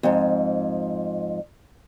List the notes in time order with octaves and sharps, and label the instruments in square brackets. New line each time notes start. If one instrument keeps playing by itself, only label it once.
[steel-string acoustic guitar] F2 G#2